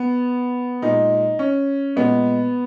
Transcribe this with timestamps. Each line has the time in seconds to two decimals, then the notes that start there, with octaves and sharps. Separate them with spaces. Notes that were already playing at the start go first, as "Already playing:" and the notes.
Already playing: B3
0.82 A#2 D#4
0.88 G#3
1.39 C#4
1.96 A#2 G#3 B3